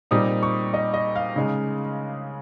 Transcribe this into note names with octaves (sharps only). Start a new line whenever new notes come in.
A#2 G3 C4 D#4 D#6
C#6
D#5
D#5
F5
C#3 G#3 D#4